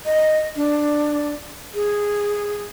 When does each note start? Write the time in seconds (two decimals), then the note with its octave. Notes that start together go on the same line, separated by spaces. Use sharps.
0.05 D#5
0.56 D4
1.74 G#4